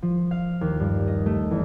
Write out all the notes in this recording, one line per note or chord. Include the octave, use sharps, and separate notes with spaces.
F3
F5
D#2
G2
D#5
A3
E2